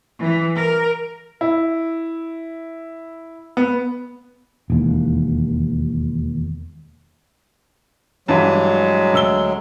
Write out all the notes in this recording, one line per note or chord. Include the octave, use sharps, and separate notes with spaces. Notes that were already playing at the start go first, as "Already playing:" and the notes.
E3
A#4
E4
B3
E1 D#2
G2 E3 F#3 G#3
D2 E6 G7